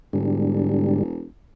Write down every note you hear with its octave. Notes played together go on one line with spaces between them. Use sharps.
E1 G#2 D3 G3